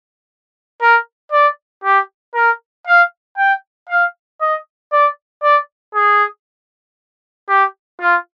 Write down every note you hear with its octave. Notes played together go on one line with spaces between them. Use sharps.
A#4
D5
G4
A#4
F5
G5
F5
D#5
D5
D5
G#4
G4
F4